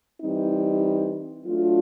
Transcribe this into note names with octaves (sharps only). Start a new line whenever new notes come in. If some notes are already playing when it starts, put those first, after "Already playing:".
E3 G3 C4 D#4
F#3 A3 D4 F4